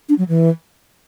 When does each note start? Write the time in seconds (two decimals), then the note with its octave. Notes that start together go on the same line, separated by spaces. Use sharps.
0.09 D4
0.18 F#3
0.29 E3